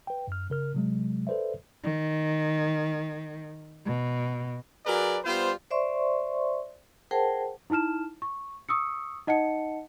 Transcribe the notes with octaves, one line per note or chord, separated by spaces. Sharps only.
B4 G5
F#2 F6
C#3 A#4 F6
C3 F#3 G#3
A4 B4 C5 D5 E5
D#3
B2
F#3 G#4 A#4 B4 D5
G3 B3 F4 C5
C5 D5 E5 C6 C#6
G#4 A#4 C5 F#5 G5 A5
D#4 E4 A5 F6 E7
C#6
C#6 D#6 E6 C#7
D#4 D#5 F#5 A5 C#7